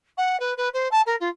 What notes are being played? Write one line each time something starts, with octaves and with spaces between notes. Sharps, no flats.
F#5
B4
B4
C5
A5
A#4
F4